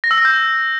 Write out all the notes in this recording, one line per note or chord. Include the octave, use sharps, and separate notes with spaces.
A#6
E6
A#6
G6